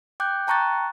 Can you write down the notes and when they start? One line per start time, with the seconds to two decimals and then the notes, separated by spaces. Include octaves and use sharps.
0.20 G5 D6 F#6 G6
0.47 G5 A5 A#5 C#6 F#6 A6